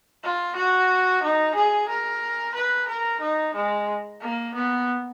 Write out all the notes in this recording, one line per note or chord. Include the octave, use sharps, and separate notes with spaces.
F4
F#4
D#4
G#4
A#4
B4
A#4
D#4
G#3
A#3
B3